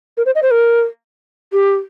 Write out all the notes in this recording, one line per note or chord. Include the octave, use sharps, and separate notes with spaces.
A#4
C5
D#5
C5
A#4
G4